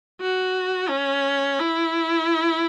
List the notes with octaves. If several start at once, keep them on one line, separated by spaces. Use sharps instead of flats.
F#4
C#4
E4